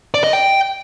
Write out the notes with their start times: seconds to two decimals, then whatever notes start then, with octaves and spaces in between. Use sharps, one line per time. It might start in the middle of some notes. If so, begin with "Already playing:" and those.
0.14 D5
0.24 D#5
0.33 G5